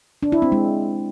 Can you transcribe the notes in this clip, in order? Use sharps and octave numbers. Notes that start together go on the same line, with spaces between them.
D4
E4
C4
G#3